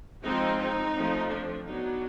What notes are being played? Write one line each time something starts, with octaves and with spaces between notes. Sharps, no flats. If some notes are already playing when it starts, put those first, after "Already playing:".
F3 G#3 C4 D#4
D#4
F3 A3 C4
D4
F#3 B3 D4 D#4